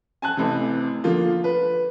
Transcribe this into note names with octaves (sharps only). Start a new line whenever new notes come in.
G#5 A5 F#6
A1 A2 C3
D3 F3 A#3 F4
B4